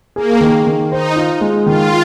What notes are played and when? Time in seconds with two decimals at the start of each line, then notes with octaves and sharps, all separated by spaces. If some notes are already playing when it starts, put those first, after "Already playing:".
0.16 A#3 G#4
0.41 D#3
0.67 D#3
0.91 D#4 C5
1.16 F4
1.41 G#3
1.66 D#3 F4